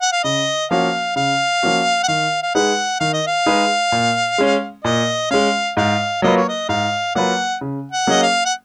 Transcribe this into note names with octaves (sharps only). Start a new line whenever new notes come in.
F#5
F5
C#3 D#5
F3 A#3 C#4 F#4 F5
C#3 F5
F3 A#3 C#4 F#4
F#5
D#3 F5
F5
G#3 D#4 G#4 B4 F#5
D#3 F5
D#5
F5
G#3 D#4 G#4 B4
A#2
G#3 C#4
A#2 D#5
G#3 C#4 F5
G#2 F5
F#3 A#3 F4 B4 D#5
C#5
D#5
G#2 F5
F#3 A#3 F4 B4 F#5
C#3
F#5
F#3 A#3 C#4 G#4 D#5
F5
F#5